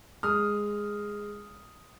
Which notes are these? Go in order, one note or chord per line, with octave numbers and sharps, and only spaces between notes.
G#3 D#6 F6